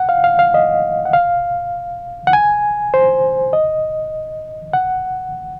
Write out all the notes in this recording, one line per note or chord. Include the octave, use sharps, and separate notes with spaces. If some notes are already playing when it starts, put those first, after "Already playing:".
Already playing: F#5
F5
F5
F5
D#5
F#5
F5
F#5
G#5
C5
D#5
F#5